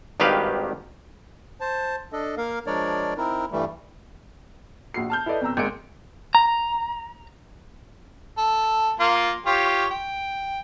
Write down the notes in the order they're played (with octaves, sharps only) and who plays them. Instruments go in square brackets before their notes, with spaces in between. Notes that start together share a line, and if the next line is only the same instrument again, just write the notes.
[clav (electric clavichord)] G#1 G2 D#3 G4 B4 F5
[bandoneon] C5 A5
D4 A4 D#5
A#3 A#4 F5
F3 G#3 D4 A#4 C#5 D5
C4 D#4 E4 A#4
G2 E3 G3 A3
[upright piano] A#1 F#4 C7
A5 F6 G6
E4 A4 B4 D5 D#5
F2 B2 A#5 E6
G#1 G#3 A#3 C#7 D7
[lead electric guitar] A#5
[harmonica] A4
A#3 F4
F4 G4 C#5
G5